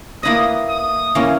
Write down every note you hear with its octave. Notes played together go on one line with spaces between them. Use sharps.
A#3 E4 B4 D#5 D#6
D#6
E3 A#3 C#4